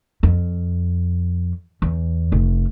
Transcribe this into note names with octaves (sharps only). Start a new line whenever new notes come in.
F2
E2
F1